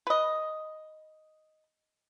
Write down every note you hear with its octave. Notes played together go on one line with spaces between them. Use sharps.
B4 D#5